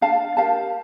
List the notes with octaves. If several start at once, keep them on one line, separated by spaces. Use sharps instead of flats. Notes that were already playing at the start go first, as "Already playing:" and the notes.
D4 F5 A5
G4 A#4 F5 A5